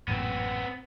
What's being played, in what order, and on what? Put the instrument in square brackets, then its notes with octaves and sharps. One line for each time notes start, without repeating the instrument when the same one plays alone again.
[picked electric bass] A1 F#2 A#2 [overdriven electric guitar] B3 C4